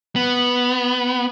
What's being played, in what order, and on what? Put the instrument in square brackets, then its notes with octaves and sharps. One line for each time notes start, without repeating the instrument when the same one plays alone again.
[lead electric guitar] B3